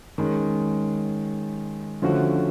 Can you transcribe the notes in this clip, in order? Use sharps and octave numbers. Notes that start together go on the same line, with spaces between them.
D#3 G#3 C#4
D3 F3 A3 C#4 F#4